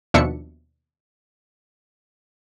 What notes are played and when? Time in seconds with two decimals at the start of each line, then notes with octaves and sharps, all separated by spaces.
0.14 D#2 B2 F3 D4 E5 C#7